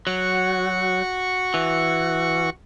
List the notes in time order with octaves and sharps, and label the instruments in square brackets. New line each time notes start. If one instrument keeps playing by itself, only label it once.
[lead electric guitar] F#3 [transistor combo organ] F#4 C#6
[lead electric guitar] E3